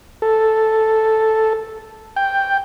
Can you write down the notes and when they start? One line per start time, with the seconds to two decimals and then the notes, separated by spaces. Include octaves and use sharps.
0.22 A4
2.16 G5